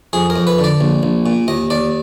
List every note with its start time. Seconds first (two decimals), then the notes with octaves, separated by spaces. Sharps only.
0.13 F2 G#4
0.30 A#4
0.36 F2
0.47 B4
0.58 D3
0.64 D5
0.81 A#1
1.03 A#1
1.26 A#2
1.48 D#2 D#5
1.70 D#2 D5